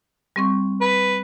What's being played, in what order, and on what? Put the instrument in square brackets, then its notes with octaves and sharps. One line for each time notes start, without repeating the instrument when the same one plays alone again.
[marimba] G3 C4 C#6
[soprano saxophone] B4